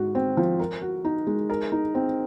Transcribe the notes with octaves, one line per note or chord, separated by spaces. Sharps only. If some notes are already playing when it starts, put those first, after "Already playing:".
Already playing: G#2 F#4
C4
F3
A#4
F#4
D#4
G#3
A#4
D#4
C4